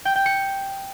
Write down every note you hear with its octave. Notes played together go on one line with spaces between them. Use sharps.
G5
G5
C#7